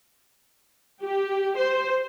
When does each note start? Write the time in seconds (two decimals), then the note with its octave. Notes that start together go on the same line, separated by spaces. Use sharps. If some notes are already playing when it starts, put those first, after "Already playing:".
1.02 G4
1.56 C5